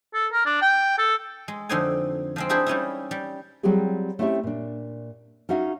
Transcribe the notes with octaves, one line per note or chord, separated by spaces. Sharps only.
A4
A#4
D4
G5
A4
G#3
F2 D3 C4 D#4 C5 G#5
F3 G#3 C4
D4 E4 G4 G#4 C5
G3 C#4 D#4 E4
G3
F#3 G3 C4 F4 G4 G#4
A3 C4 C#4 E4 G4 E5
A#2 D4
C#4 D#4 F#4 E5 F5